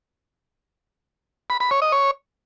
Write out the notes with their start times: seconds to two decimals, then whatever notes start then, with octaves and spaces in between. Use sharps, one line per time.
1.50 B5
1.60 B5
1.71 C#5
1.82 D#5
1.92 C#5